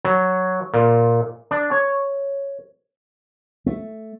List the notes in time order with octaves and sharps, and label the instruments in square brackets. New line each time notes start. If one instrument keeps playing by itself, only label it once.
[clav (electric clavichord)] F#3
A#2
D4
C#5
[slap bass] A3